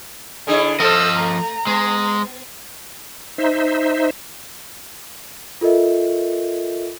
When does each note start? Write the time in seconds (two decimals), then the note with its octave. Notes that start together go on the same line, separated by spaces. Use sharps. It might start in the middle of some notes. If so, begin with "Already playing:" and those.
0.47 D3 D4 E4 G#4 C#5
0.80 F3 A4 C5 D#5 E6 F6
1.19 A3 A#5
1.67 G#3 B3
3.38 D#4 C5 E5
5.61 F4 A4 A#4 D#5 E5